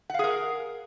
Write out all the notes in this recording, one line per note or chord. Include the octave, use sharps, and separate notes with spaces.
G#4 A#4 F5 F#5